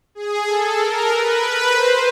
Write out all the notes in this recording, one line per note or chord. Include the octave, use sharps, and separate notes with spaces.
G#4
A4
A#4
B4
C5